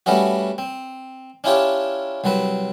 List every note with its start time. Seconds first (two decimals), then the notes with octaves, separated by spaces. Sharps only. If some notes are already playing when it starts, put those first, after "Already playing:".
0.06 G3 A3 B3 C#4 F#4
0.58 C4
1.44 C#4 D4 E4 F4 G4 C#5
2.24 C2 F#3 C4 B4